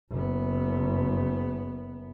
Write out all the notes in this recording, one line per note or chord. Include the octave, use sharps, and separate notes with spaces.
F#1 B3